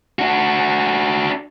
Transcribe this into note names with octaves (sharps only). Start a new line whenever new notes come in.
D4 F#4